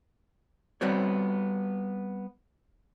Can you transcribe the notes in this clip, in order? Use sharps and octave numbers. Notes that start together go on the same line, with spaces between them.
G3 B3 C4 F#4 C#5